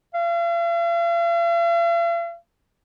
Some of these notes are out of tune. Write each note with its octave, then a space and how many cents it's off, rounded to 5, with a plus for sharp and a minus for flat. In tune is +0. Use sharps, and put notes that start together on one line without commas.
F5 -45